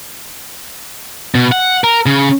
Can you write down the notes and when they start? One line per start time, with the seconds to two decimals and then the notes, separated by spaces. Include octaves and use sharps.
1.35 B2
1.52 F#5
1.84 A#4
2.06 C#3